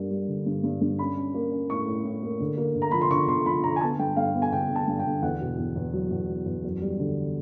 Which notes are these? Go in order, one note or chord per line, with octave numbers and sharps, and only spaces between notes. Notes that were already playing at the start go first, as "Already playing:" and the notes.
Already playing: G2 G3 A#3
G3
D3
G2
G2
G2
C#4 B5
C#4
A#3
C#4
A2 C#6
A2
A2
A#3
D3
A#3
D3
A#5
F3 B5
C6
D3 C#6
D3 C6
F3 B5
D3 A#5
G#5
B3 A5
G2 G5
G2 F5
B3
G#5
D3 G5
D3
A5
G2
G5
D3
E2 F#5
B2
E2
E2
F#3
E2
F#3
E2
F#2
G3
D3